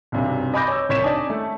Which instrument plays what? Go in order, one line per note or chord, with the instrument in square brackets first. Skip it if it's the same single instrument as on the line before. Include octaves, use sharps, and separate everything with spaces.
[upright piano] B1 G2 C3
D#5 G#5 B5 D6 G6 A#6
C#5 E6
C2 C#5 B6 E7
D4 D#4 D5 D#5 G#5 A5
A3 C#4